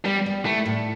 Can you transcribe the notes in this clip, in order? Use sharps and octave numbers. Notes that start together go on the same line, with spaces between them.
G3 B3
G3
A3 E4
A2